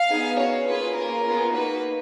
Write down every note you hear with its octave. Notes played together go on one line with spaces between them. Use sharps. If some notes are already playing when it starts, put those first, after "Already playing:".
Already playing: F5
B3 D#4 G#4
C#4 F#4 C#5
A#3 F4 G#4 B4
A#3 C#4 F4 A#4
B3 F4 G#4
A#3 D#4 F#4 B4